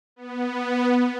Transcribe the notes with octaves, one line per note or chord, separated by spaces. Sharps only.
B3